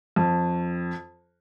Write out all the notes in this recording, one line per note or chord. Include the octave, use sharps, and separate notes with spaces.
F2